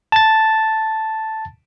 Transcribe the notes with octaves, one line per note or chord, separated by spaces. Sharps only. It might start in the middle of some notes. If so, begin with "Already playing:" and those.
A5 A6